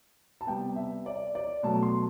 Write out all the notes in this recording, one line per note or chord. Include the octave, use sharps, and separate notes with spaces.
A5
C3 G3 B3 G5
E5
D5
D5
B2 F#3 A3 A5
C6